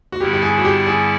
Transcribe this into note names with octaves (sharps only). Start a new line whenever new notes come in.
F#4
G2 D3 G3 B3 E4 G4
G4
G#4
F#4
G4
G#4